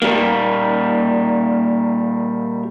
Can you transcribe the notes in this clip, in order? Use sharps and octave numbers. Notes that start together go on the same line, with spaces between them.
A#2 G3 A#3